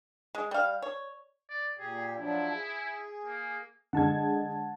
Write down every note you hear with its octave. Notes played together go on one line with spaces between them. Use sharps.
G#3
G3 F5
C#5
D5
A#2 G4 G#4
F3 F#3 D4 E4
G#4
A#3
D3 G#3 F#5 A5 G#6